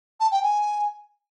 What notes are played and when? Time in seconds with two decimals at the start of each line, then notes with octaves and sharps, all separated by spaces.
0.20 A5
0.32 G5
0.43 G#5